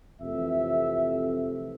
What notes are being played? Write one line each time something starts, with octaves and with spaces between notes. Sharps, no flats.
F2 C3 E3 A3 E5